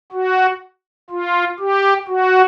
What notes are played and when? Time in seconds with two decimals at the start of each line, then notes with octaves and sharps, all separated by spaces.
0.12 F#4
1.10 F4
1.59 G4
2.08 F#4